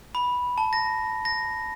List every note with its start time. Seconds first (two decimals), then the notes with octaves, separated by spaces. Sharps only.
0.15 B5
0.58 A5
0.73 A#6
1.25 A#6